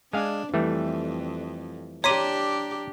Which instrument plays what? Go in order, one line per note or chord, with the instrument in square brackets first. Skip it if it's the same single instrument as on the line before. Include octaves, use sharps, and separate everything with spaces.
[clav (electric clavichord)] G#3 F5 G#5 [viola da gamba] D4
[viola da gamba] F2 [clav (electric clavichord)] E3 G3 A3
[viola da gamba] D4 G4 [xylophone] C#5 B6 D#7 [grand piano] A#5 C6 D6